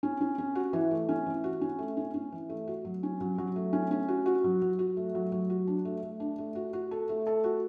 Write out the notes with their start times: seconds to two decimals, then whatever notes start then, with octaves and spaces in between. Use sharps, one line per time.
0.03 C#4
0.21 C#4
0.38 C#4
0.55 F#4
0.73 E3
0.91 A3
1.09 C#4
1.26 E3
1.44 F#4
1.61 C#4
1.79 A3
1.97 C#4
2.14 C#4
2.32 E3
2.49 A3
2.67 F#4
2.85 F#3
3.03 C#4
3.21 F#3
3.38 F#3
3.56 A3
3.73 C#4
3.91 C#4
4.08 F#4
4.26 F#4
4.44 F#3
4.62 F#3
4.79 F#4
4.97 A3
5.15 F#3
5.32 F#3
5.50 F#4
5.67 D4
5.85 A3
6.03 A3
6.20 D4
6.38 A3
6.55 F#4
6.73 F#4
6.91 A4
7.09 A3
7.27 A4
7.44 F#4